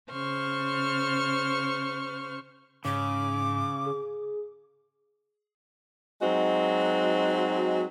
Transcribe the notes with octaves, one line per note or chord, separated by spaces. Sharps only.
C#3 C5 C#6 F6
G#2 C#3 D6
G#4
F#3 G#3 C4 D#4 F#4